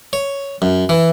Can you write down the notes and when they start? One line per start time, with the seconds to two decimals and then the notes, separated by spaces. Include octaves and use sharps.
0.13 C#5
0.62 F#2
0.89 E3